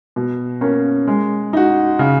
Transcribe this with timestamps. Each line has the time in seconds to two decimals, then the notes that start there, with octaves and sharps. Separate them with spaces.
0.16 B2
0.61 A#3 C#4
1.07 G#3
1.53 D#4 F#4
1.99 C#3